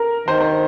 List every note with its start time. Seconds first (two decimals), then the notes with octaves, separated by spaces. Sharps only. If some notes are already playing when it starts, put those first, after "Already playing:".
Already playing: A#4
0.28 D#3 C5
0.41 C5